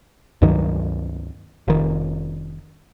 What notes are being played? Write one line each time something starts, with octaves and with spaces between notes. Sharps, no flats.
C#2 G2 D#3 F#3
F1 D#3